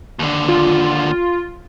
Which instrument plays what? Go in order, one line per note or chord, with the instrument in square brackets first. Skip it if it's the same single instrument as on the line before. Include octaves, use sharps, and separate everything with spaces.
[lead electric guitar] D#2 D3
[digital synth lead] F4